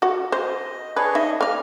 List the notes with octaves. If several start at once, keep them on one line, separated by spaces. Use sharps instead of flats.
F#4 F#5
C5 D#5
D4 G#4 B4 C#5
D#4 D#5 E5
A#3 D5 F6